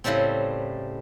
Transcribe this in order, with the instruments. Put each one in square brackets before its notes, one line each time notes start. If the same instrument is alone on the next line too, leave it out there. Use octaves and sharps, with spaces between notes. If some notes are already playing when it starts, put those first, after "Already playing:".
[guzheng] A2 C#3 G3 A3 C4